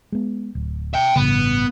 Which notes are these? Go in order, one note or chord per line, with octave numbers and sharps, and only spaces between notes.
G#3 B3
D1
E5 G5
A1 G2 C#3 B3